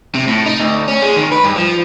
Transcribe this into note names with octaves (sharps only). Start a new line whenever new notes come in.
C3
A2
D#4
D2
C#4
G#3
D#3
B4
G2
F3